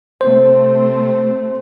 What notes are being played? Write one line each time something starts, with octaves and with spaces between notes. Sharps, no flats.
C3 A3 C4 C5